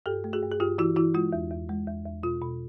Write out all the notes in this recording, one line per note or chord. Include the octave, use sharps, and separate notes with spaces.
G2 G4 A4
A3
F#4 G#4
G2
G#4
G2 F4 G4
E3 E4 F#4
E3 E4 F#4
G#3 F4
E2
E2
G#3
E2
E2
B2 F4
B2